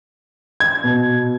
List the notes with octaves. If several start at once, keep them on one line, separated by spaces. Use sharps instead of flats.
G#6
B2